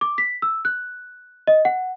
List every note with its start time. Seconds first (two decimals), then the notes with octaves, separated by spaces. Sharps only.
0.01 D6
0.18 B6
0.42 E6
0.65 F#6
1.47 D#5
1.65 F#5